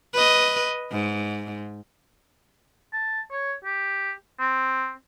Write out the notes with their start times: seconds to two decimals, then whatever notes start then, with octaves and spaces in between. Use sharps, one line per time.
0.13 B4 D#5
0.91 G#2
2.93 A5
3.31 C#5
3.64 G4
4.40 C4